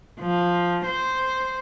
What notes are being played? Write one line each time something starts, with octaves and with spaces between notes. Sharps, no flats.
F3
C5